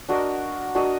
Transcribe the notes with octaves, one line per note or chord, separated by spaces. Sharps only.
D4 F#4 A#4 D#5
D4 F#4 A#4 D#5